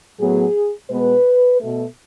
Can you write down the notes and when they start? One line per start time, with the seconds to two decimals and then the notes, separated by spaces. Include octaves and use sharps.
0.20 A2 F#3 B3 G#4
0.90 B2 G#3 B3 B4
1.61 B2 A3